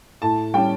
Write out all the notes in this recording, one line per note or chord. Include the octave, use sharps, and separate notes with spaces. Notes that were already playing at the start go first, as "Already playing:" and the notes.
A2 A5
G3 C#4 G5